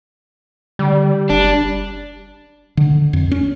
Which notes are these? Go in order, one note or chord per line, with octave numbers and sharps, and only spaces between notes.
D3 G3
F#1 D4
D3
F2
C#4